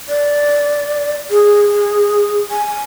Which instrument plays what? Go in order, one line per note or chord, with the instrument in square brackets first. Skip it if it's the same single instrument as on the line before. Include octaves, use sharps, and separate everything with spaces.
[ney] D5
G#4
G#5